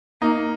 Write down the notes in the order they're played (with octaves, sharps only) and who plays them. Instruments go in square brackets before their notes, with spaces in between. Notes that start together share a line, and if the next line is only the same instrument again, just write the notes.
[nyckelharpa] A#3 [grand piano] D#4